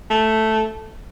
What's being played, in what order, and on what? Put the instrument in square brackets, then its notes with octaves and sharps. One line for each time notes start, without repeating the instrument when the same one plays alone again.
[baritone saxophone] A3